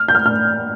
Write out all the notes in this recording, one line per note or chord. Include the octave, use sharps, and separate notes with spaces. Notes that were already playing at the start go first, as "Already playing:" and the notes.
Already playing: F6
G6
F6
F6